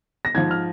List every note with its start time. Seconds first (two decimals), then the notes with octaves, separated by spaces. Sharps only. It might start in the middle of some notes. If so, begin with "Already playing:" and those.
0.25 A#6
0.35 G#2 F3 G#6
0.51 F6